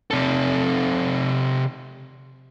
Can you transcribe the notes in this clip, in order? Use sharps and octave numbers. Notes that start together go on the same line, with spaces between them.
C3 A4